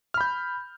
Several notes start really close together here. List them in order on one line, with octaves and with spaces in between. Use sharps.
F6 B5 G6